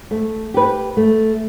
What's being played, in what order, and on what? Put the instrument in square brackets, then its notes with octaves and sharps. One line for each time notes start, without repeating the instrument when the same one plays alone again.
[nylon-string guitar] A3
G4 B4
A3